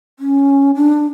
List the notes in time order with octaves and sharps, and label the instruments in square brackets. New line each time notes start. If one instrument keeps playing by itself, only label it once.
[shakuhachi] C#4
D4